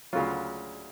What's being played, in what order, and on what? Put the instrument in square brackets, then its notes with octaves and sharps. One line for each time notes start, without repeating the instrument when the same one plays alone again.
[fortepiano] D2 C#3 F#3 F4